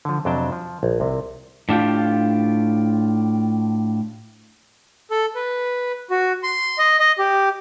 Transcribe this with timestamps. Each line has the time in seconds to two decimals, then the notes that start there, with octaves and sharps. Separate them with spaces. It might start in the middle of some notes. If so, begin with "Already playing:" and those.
0.05 D3 F3
0.25 F2 C3 F#3 D4 G5 A5
0.52 F3
0.83 A#1
1.00 C2 C3
1.69 A2 D4 F4 G4
5.11 A4
5.35 B4
6.10 F#4
6.43 C6
6.78 D#5
7.00 D#5
7.18 G4